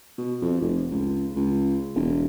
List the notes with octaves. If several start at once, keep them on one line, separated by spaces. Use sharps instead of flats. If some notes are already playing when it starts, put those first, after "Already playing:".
B2
F2
F1
C#2
C#2
E1